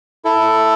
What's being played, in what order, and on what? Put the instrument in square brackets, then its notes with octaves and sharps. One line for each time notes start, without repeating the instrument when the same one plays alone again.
[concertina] E4 A4